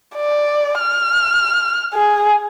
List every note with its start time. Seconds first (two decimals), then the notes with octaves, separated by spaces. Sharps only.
0.16 D5
0.80 F6
1.94 G#4